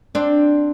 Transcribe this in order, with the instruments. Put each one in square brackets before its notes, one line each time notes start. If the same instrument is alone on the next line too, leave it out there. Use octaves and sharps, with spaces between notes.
[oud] C4 D4